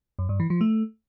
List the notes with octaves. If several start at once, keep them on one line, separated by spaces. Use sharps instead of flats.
F#2
G2
E3
F3
A3